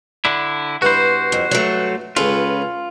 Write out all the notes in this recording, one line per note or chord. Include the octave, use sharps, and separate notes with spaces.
D3 D4 E4
G2 B3 E4 F#4 C5
F2
F#3 A3
C#2 C#3 C#4 F4 A4 B4